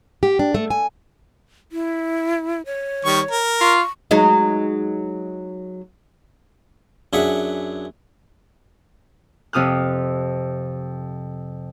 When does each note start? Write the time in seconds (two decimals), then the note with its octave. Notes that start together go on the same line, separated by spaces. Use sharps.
0.23 G4
0.39 D4
0.55 A3
0.70 G#5
1.72 E4
2.66 C#5
3.05 D#3 G3 C#6
3.31 A#4
3.61 F4 C#6
4.11 F#3 G#3 D#4
7.13 F#2 D4 G#4 E5 F#5
9.53 F2 C3 F4 D#6 F6 F#6